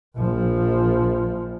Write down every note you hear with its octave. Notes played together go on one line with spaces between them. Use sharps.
A#1 F3